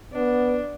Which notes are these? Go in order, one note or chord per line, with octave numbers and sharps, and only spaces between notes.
B3 D4